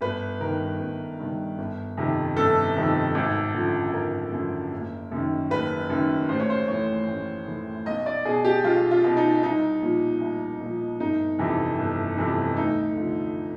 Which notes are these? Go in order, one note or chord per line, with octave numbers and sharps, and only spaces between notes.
G1 B4
G2 D#3 A#4
G1
G2 D#3
G1
F2 C3 D#3
G1 A4
F2 C3 D#3
G#1
F#2 D3 F3
G#1 A#4
F#2 D3 F3
F#1
F#2 D#3
F#1 B4
F#2 D#3
A1 C5
C#5
C5
A2 E3 C#5
A1
A2 E3
B1 D#5
D5
B2 G#4
G4
B1 F4
F4
B2
D#4
C2 D#4
A#2 F3
C2
A#2 F3
G1 D#4
F2 C3 E3
G1
F2 C3 E3
D2 D#4
D3 F3